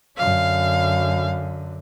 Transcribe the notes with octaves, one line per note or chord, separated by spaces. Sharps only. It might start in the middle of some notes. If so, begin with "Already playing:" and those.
F#2 D3 F5